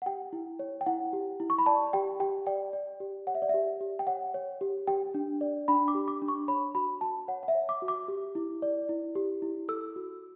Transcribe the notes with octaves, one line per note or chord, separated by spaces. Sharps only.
F#5
G4 G5
E4
C#5
G5
E4 F#5
G4
E4
C#6
B5
D5 A5
G4 G5
G4 G5
D5 G5
D5
G4
C#5 F#5
E5
D5
G4 E5
G4
G5
C#5 F#5
C#5
G4
G4 G5
D4
D5
D4 B5
D6
G4
D6
D4
C#6
C#5 B5
F#4 B5
F#4 A5
C#5 F#5
F#5
E5
C#5
D6
F#4
D6
G4
E4
D5
E4
G4
E4
A4 E6
F#4